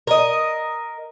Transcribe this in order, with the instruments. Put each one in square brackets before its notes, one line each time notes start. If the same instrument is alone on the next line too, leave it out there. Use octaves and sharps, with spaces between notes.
[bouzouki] A#4 D#5